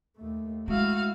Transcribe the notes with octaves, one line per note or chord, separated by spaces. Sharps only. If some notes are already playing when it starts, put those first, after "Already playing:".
D#2 A3
G#3 A3 E4 F#4 F5